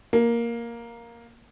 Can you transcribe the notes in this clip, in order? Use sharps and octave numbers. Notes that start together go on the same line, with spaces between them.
A#3